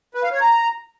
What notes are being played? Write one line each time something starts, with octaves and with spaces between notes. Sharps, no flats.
B4
F5
C#5
A#5